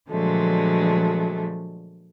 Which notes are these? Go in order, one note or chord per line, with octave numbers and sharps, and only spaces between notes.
A#2 D3 F3 F#3 G#3 A3